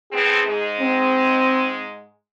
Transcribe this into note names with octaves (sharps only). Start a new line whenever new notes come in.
A2 B3 C4 G#4
G#2 G#3
C4